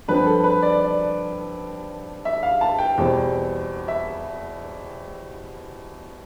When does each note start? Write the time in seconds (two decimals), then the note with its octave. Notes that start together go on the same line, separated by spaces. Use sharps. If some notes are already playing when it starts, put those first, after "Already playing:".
0.08 G2 F3 C4 B4
0.26 A4
0.44 B4
0.62 D5
0.80 D5
2.25 E5
2.43 F5
2.61 A5
2.79 G5
2.98 E2 B2 G3 C4
3.88 E5